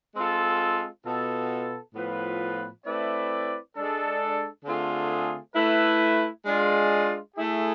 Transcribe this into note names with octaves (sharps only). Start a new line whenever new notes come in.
G#3 C4 F4 A4
B2 B3 F4 A4
A2 F3 B3 F4 B4
A3 C4 E4 B4 D5
G#3 D4 A4
D3 A3 C4 F4 G#4
A3 E4 B4
G#3 D4 F4
A3 E4 G#4